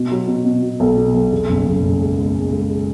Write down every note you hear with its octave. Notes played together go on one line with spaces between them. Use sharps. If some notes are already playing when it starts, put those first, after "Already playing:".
Already playing: B2
F#3
B2
B2
B2
B1
B2
B1
E2
F#1
F#1
F#1
G#3
G#3
G#3
G#3